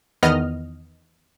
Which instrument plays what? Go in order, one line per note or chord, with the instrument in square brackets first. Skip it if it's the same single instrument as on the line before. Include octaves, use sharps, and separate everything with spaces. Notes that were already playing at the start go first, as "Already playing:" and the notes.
[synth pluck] E2 D#3 B3 D#5 F6